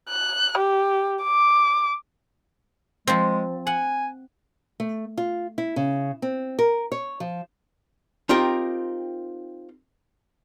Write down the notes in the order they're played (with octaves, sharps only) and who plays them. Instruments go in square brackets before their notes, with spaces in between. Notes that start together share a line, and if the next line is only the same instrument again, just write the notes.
[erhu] F#6
G4
D6
[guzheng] F3 C4 [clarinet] G#3
[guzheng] F#5 [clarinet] G#5
[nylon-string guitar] A3
F4
E4
C#3
C4
A#4
C#5
F3
[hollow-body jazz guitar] C4 D#4 F4 G4 A#4 G5